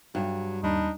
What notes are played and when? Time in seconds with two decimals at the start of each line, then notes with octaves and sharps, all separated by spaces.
0.15 G2 F#3
0.63 D#2 G3 D4 D#4 B5